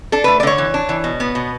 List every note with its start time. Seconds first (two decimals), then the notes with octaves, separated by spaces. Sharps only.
0.12 D4 A4
0.24 A3 B4
0.40 D5
0.43 D3 C#5
0.58 E3
0.74 D4
0.89 E3
1.04 B2
1.20 B3
1.35 B2